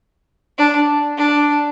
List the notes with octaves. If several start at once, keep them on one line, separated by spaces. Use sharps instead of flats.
D4
D4